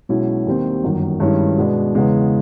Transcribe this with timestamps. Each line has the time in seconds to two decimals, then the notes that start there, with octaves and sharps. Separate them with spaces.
0.09 B1 B2 G#3 C#4 E4
0.47 D#2 D#3 G3 C4
0.83 G1 F#2 D#3
1.20 G2 D#3 G#3 C#4 E4
1.57 B2 G#3 B3 D4
1.95 E2 C#3 E3 G#3 B3